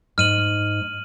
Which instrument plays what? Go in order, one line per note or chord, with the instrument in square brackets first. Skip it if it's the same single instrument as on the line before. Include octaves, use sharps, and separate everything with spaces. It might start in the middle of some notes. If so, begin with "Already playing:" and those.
[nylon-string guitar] G#2 [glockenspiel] F6 D#7 F#7